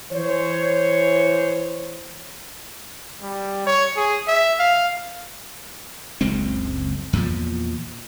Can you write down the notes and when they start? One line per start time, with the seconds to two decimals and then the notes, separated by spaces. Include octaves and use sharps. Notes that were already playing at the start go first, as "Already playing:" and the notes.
0.13 E3 C5 C#5
3.22 G3
3.67 C#5
3.97 G#4
4.28 E5
4.59 F5
6.21 F#1 C#2 G#3 C4
7.13 E2 A#2 F3